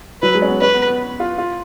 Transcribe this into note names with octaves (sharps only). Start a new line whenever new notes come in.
F#3 B4
G#3
C#4
B3
C#4 B4
B3
B3
F4
F4